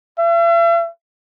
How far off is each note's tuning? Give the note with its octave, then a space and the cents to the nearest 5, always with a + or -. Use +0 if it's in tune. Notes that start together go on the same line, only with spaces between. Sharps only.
E5 +45